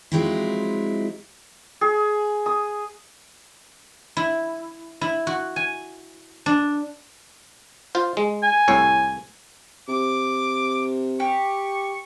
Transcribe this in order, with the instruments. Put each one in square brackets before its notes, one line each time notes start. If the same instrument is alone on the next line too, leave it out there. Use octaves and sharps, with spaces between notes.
[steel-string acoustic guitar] F3 F#3 G#3 C4 D#4 E4
[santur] G#4
D#6
[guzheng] E4
E4
F#4
G#5
D4
[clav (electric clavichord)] F4 C5
G#3
[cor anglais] G#5
[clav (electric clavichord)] C2 A2 C#5
[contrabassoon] C3 [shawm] D6
[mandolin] G4 [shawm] C#6